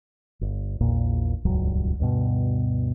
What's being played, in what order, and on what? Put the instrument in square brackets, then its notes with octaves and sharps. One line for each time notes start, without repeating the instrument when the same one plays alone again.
[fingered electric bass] G1
A#1 E2 A#2 A#3
D#1 C#2 G2 F#3
D2 G2 B2